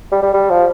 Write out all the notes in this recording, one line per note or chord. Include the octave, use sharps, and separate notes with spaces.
G3
G3
G3
F3